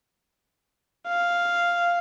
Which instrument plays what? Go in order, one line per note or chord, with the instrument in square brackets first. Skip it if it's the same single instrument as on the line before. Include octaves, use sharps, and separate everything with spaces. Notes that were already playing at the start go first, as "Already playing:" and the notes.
[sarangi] F5